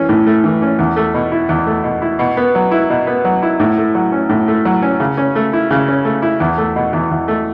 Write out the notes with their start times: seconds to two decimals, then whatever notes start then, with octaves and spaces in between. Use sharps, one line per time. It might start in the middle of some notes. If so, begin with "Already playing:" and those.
Already playing: E3 C#4
0.09 A2
0.27 A3
0.44 E3
0.62 C#4
0.79 E2
0.96 A3
1.14 B2
1.32 E4
1.49 E2
1.67 A3
1.84 B2
2.02 E4
2.19 B2
2.37 B3
2.55 F#3
2.71 E4
2.90 B2
3.07 B3
3.25 F#3
3.43 E4
3.60 A2
3.78 A3
3.95 F#3
4.12 C#4
4.29 A2
4.48 A3
4.65 F#3
4.82 C#4
5.00 C#3
5.18 C#4
5.35 A3
5.53 E4
5.71 C#3
5.88 C#4
6.05 A3
6.22 E4
6.40 E2
6.58 A3
6.76 B2
6.93 E2
7.11 E2
7.28 A3